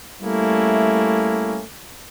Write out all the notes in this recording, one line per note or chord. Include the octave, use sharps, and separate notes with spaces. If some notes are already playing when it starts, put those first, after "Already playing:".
G3 A3 A#3 C#4 E4